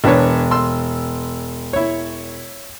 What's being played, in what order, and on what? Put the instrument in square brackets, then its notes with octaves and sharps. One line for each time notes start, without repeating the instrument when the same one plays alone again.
[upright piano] E1 [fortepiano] D4 B4 C#5
[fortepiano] C6 E6
E4 C#5